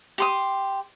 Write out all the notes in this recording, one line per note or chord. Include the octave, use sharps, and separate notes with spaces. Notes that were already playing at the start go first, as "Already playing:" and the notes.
G4 C6 D#6